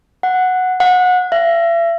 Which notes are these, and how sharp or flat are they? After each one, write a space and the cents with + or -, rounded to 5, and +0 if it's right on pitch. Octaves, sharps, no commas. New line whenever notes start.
F#5 -5
F#5 -25
E5 +40